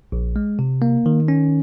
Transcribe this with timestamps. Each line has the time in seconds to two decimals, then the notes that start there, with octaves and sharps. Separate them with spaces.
0.12 A#1
0.36 G#3
0.59 C3
0.82 A#3
1.06 D#3
1.28 C#4